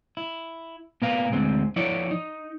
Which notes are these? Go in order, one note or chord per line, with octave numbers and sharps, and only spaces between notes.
E4
A#2 A#3 B3 A#4 F5
D2 G#3 C4
F3 E4 C#5 D5
D#4